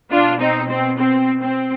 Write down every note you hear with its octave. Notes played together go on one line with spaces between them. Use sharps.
B2 D4 F4
C4 D#4
C4
C4
C4